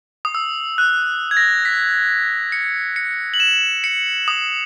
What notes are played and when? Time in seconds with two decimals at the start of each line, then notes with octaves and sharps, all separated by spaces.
0.25 D#6
0.35 E6
0.78 F#6
1.31 G#6
1.37 A#6
1.65 B6
2.52 C#7
2.96 C#7
3.34 F#7
3.40 E7
3.84 C#7
4.28 D#6